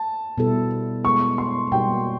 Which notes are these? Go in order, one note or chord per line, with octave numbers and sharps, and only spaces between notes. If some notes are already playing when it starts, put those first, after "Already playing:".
Already playing: A5
B2 G3 B3 E4 A4
G#3 B3 E4 C#6
C6
B2 G3 A#3 D#4 F#4 G5